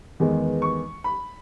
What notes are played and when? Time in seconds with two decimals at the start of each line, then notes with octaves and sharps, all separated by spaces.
0.20 E2 D#3 G#3 B3
0.62 C#6
1.04 B5